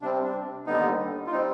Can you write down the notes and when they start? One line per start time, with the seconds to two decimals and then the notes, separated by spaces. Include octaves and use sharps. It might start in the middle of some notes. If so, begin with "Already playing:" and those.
0.02 C3 G3 C4 D4
0.13 C4
0.24 D4
0.67 D#2 D3 G3 B3 D#4
1.27 F4
1.31 G3 C4 D#4